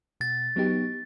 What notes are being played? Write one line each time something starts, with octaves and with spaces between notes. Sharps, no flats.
B2 A6
F#3 B3 D#4 G4